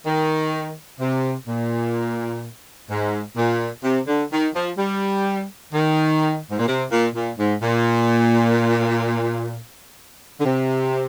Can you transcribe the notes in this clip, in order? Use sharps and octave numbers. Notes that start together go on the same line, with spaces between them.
D#3
C3
A#2
G#2
A#2
C3
D3
D#3
F3
G3
D#3
G#2
A#2
C3
A#2
A#2
G#2
A#2
D3
C3